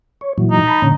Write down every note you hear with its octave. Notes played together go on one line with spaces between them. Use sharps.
C#5
A#2 E3 F#3
D#4
A5 B5
A#2 D3 C#4